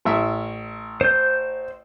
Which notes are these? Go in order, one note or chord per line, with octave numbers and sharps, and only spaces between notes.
A1 E5
C5 G6